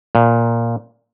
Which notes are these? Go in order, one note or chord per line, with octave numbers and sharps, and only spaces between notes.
A#2